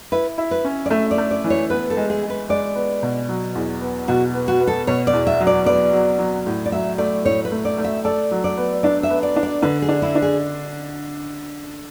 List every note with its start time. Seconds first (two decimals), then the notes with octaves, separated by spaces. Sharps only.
0.12 E4 B4
0.38 E4
0.51 B4
0.65 C#4
0.86 D5
0.90 A3 E5
1.11 D5
1.18 A3
1.31 D5
1.44 E3
1.50 C#5
1.70 B3 B4
1.90 A4
1.97 G#3
2.10 G#4
2.23 G#3
2.30 B4
2.49 G#3 D5
2.75 B3
3.03 B2
3.29 F#3
3.55 E2
3.82 B3
4.08 B2 F#4
4.34 B3
4.48 F#4
4.61 B3
4.67 A4
4.87 B2 C#5
5.07 D5
5.13 E2
5.27 E5
5.40 F#3
5.47 D5
5.66 B3 D5
5.93 F#3
6.19 F#3
6.46 A2
6.65 D5
6.72 F#3 E5
6.98 A3 D5
7.25 A2 C#5
7.45 B4
7.52 A3
7.65 D5
7.78 A3
7.84 E5
8.05 A4 D5
8.31 F#3
8.44 D5
8.57 B3
8.83 D4 D5
9.03 E5
9.10 B3
9.23 D5
9.36 D4
9.43 D5
9.63 D3 B4
9.82 G#4
9.89 D4
10.02 E4
10.15 D4
10.22 G#4